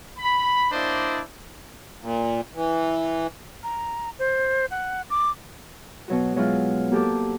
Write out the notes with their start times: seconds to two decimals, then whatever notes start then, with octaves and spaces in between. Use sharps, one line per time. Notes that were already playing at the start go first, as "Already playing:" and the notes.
0.18 B5
0.71 A#3 D4 E4 C5 D5 D#5
2.01 A#2
2.55 E3
3.63 A#5
4.19 C5
4.71 F#5
5.10 D6
6.08 B2 F#3 F#4
6.36 F#3 G#3 E4 F4
6.91 A#3 F#4 G4 A4 A5 D6